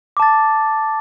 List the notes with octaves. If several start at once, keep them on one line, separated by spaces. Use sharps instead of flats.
A5 D6 A6